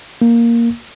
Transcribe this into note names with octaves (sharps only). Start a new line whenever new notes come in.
A#3